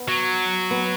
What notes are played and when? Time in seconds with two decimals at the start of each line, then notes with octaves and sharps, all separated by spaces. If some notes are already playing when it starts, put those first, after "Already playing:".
Already playing: B3
0.08 F#3
0.71 B3